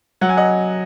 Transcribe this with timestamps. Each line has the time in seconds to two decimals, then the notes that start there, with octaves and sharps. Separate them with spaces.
0.21 F#3 F#5
0.29 G#5
0.37 D#5 F#5